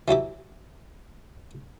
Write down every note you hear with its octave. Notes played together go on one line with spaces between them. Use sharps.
E3 F#3 E4 G4